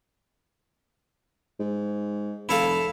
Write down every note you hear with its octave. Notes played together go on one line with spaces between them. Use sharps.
G#2
F1 E4 A4 F5